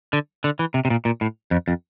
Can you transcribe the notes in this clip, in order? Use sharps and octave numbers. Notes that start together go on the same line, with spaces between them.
D3
D3
E3
C3
C3
A#2
A#2
A2
F2
F2